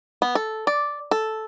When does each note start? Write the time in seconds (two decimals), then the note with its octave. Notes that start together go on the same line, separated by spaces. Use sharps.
0.22 B3
0.35 A4
0.67 D5
1.11 A4